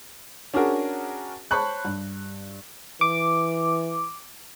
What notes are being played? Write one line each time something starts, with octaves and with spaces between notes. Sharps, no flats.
C#4 D4 F#4 G#4 A#4
C5 C#5 A5 B5 C#6 F#6
G2
E3 D6